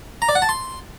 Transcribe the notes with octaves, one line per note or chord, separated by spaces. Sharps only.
A#5
D5
F#5
A5
C6